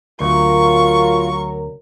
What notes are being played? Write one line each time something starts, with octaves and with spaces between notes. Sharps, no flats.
D2 F#3 F4 A#4 C#6